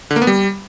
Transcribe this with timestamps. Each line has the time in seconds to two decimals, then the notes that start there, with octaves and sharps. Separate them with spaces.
0.11 D3
0.16 A#3
0.22 B3
0.27 G3